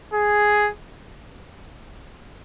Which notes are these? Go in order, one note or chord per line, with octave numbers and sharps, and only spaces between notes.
G#4